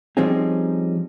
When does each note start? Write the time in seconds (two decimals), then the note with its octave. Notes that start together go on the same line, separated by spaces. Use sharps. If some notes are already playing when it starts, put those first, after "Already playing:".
0.17 F3 G3 C4 C#4 D#4 G#4